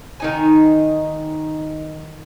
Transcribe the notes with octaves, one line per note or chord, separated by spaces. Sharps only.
D#3 D#4 G#5